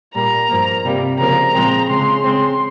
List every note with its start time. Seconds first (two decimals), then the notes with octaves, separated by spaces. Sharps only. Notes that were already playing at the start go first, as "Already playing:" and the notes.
0.14 A#2 G3 A#3 A#5
0.49 G2 F3 A#3
0.84 C3 G3 A#3
1.19 C#3 F3 A#3 A#5
1.54 A#2 F3 G#3 C4
1.89 C#3 G#3 C4 C6
2.24 C#3 G#3 C4